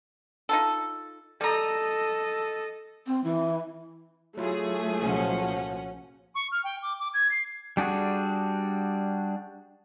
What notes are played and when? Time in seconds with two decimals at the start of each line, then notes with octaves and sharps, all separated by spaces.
0.49 D#4 F4 A4
1.41 G3 A4 D#5 A#5
3.07 C4
3.24 E3
4.37 F#3 A3 E4 F4 G#4
5.03 C2 A#2 F3 C#4 F#4
6.34 C#6
6.51 F6
6.64 G5
6.82 D6
6.98 D6
7.13 G#6
7.31 C7
7.77 G3 D4 F#4 G#4